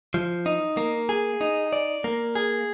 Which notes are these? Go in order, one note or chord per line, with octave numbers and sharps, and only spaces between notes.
F3
D#4
A#3
G#4
D#4
D5
A#3
G#4